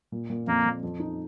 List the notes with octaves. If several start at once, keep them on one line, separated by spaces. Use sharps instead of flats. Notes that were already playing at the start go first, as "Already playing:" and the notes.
A#2
A#2
F2 A#3
F2
F2
D#4